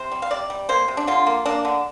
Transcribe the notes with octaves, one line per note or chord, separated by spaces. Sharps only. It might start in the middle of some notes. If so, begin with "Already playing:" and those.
Already playing: C3 C5
G3
F5
C3 D5
G3
A#3 C5
C3
D4
D3 F4
A#3
A#3 D4
D3